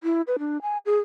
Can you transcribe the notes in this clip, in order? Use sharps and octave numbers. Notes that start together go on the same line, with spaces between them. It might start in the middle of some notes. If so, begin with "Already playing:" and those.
E4
B4
D4
G#5
G#4